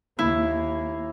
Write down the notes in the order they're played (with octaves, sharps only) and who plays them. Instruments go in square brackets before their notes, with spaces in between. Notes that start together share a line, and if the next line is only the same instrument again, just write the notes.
[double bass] D#2 A#3 [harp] E4